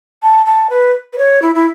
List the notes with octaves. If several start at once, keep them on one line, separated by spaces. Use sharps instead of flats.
A5
A5
B4
B4
C#5
E4
E4